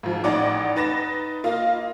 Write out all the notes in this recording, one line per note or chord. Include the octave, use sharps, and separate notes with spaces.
G#2 F3
A1 D#4 D5 F#5 D6
D#4 B4 A6 A#6 E7
A#3 F4 D#5 F5